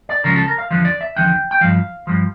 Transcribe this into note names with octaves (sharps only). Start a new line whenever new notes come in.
D5
C#2 C#3 F3 A#4
A4
A#4
F5
E2 D3 F3 F5
D5
E5
E2 D3 F3 G5
G5
G2 F3 F5
G2 F3